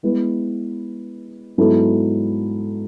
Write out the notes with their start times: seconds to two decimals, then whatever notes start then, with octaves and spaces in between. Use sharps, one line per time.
0.03 G#3 B3 E4 B4
1.58 G#2 F#3 B3 E4 A4